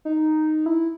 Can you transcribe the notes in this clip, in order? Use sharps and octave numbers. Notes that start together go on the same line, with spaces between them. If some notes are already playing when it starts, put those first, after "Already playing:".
D#4
E4